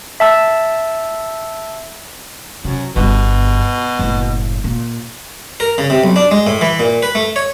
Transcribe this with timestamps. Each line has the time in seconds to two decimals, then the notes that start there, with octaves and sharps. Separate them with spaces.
0.20 E5 A5 E6
2.65 F#2 C3
2.96 G1 G2 B2
3.99 F#1 A2
4.64 A#2
5.60 A#4
5.78 C#3
5.90 C3
6.04 B1
6.16 D4
6.31 G#3
6.47 A2
6.61 E3
6.80 A#2
7.02 B4
7.15 A3
7.36 C#5